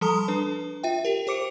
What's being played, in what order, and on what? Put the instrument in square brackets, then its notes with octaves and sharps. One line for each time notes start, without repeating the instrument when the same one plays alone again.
[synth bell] F3 G3 A4 A5 A#5 D#6
D4 B4
F4 E5 G5
G4 A#4
G4 C5 D6 C#7 D7